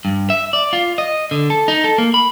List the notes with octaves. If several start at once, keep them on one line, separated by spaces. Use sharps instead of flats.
G2
E5
D5
F4
D#5
D3
A4
D#4
A4
A#3
B5